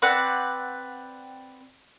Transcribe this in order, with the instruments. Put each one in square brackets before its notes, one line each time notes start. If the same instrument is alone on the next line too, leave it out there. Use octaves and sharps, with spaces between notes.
[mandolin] C4 B4 D5 F#5